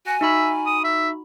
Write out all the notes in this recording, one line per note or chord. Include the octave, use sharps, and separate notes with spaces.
F#4 G#5
D#4 F#4 E5 B5
D#6
E5